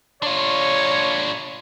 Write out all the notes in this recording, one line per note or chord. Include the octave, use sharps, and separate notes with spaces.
D4 F4 C#5